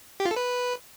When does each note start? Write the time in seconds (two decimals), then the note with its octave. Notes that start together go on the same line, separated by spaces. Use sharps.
0.20 G4
0.25 F4
0.31 A4
0.36 B4